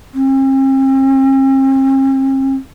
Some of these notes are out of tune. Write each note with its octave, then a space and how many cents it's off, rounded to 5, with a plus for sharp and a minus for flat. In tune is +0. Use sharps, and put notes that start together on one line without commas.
C4 +45